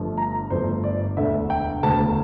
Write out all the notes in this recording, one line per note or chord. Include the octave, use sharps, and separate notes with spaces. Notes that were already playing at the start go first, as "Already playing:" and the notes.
Already playing: G1 G2 F3 A3
A#5
G1 G2 F3 A3 C5
D5
E1 D2 D3 A3 E5
G5
E1 D2 D3 A3 A5